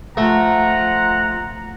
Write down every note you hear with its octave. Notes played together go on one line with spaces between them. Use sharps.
F3 A3 F4 F#5 A#5